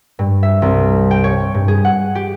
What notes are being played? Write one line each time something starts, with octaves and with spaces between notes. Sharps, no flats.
G2
E5
C2
G5
C#5
G2
G#4
F#5
G4